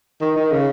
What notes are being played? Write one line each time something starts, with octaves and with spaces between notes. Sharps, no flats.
D#3
D#3
C#3